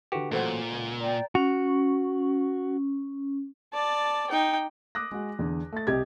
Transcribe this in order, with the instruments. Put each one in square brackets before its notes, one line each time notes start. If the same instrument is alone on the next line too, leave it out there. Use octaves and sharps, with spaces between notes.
[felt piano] D3 B4 [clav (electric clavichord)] F#4 G4
[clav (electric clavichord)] A1 F#3 [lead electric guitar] A#2 [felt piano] A4 C5 F#5
[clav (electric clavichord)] C#2
[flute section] D5 G5 A#5
[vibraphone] C#4 [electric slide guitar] F#4
[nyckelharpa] D5 A5
D#4 G5
[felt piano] D6 D#6 F#6 A#6
G#3 F#4
E2 D3
A3 A6
C2 G4 D#5 G#6